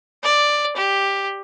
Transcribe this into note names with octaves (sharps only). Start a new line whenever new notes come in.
D5
G4